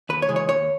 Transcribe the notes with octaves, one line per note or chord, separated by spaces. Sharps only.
D#2 B4
C#5
C#3 E3 G#3
C#5
D#2 C#5